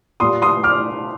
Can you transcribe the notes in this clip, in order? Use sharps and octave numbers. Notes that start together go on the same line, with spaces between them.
A#2 G3 C6 D#6
C6 D#6
D6 F6